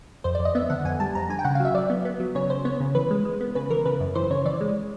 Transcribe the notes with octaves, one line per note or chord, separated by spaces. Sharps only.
F2 C5
D5
F2
D#5
B3 E5
D3 F#5
F2 G#5
G3 A5
F2 A#5
D3 G#5
G5
C#3 F#5
F5
F#3 E5
F#3 D5
B3
B3
F#3
C#3 C#5
C#3 C5
B3 C#5
C#3
E3 B4
G#3
G#3
B3
C#3 B4
E3 A#4
C#3 B4
F#2
E3 C5
C#3 C#5
E3 D5
G#3